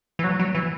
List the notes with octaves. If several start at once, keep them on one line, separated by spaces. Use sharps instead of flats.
E3
F#3
F#3
E3